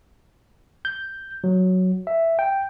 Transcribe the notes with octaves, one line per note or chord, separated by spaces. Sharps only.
G6
F#3
E5
G5